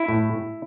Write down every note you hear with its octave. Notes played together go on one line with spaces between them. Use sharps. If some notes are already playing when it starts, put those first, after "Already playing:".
Already playing: E4
A2